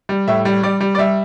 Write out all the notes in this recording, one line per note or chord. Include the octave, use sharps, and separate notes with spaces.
G3
A2 E5
G3
G3 D5
G3
D5
G3 E5